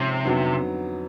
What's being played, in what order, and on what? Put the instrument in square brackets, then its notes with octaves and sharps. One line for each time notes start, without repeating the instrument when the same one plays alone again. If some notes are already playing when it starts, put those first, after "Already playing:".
Already playing: [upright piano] G#2 F3 G#3 C#4 [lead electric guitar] C3
[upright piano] F2 D3 F#3 B3 D#4